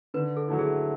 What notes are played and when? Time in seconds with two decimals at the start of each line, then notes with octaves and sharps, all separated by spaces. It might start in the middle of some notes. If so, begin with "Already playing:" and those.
0.14 D3 B4
0.37 A4
0.48 F#3 A3 E4
0.59 G#4